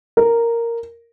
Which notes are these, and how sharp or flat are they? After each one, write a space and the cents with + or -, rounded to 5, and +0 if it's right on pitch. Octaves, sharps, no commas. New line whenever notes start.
A#4 -5